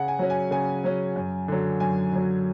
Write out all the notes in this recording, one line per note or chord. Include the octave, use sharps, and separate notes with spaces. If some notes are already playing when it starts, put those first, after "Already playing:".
Already playing: C#3 F#5
G#5
F#3 C#4
G#5
C#3 G#5
F#3 C#4
F#2
D3 F#3
F#2 G#5
D3 F#3